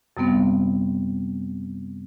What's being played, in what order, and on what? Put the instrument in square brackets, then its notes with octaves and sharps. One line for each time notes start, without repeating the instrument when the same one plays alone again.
[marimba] F#2 C3 G3 B3 C4